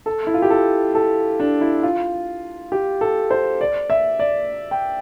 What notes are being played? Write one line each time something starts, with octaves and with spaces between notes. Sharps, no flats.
A4
E4
F4
G4
A4
A4
D4
E4
F4
G4
A4
C5
D5
E5
D5
G5